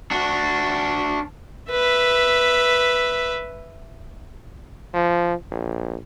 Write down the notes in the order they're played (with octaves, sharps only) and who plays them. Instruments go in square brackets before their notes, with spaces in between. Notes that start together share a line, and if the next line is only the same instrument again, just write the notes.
[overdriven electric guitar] D4 F#4
[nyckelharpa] B4 E5
[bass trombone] F3
A#1